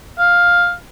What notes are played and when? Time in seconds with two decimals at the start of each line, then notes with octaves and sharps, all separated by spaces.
0.19 F5